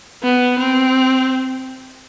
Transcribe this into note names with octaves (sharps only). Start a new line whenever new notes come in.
B3
C4